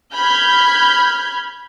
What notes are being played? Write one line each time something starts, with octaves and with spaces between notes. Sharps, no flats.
B5 F6 G6 G#6